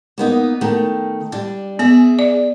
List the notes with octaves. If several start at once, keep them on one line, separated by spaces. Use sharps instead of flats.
A#3 B3 D#4
D#3 A3
G3 D4
B3 G#4 E5
D5